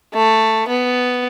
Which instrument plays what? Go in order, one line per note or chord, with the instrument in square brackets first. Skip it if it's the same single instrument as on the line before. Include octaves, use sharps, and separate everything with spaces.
[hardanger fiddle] A3
B3